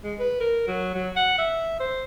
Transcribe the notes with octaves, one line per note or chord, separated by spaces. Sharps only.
G#3
B4
A#4
F#3
F#3
F#5
E5
C5